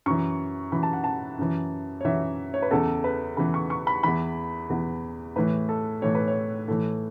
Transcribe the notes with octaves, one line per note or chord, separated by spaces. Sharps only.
F#2 E3 C#6
F#2 E3 B5
A5
F#5
A5
F#2 E3
C#5
F#2 E3 E5
C#5
B4
E2 C#3 E3 A4
B4
E2 C#3 E3 B5
C#6
C#6
B5
E2 E3 B5
E2 E3
A2 E3 B4
A4
A2 E3 C#5
B4
C#5
A2 E3 A4